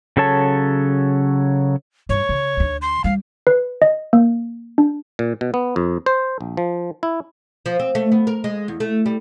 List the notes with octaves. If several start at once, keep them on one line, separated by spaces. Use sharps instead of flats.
C#3 F#3 A4 C#5 A5
G2 C#5
C#3
D2 D3
C6
G3 F5
B4
D#5
A#3
D4
A#2
B2
B3
F2
C5
A#1
F3
E4
F3
C4
A3
B3
A#4
G#3
E2
A3
G3